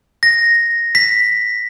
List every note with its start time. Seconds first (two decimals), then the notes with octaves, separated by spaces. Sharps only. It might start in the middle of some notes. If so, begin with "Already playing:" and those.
0.23 A#6
0.95 B6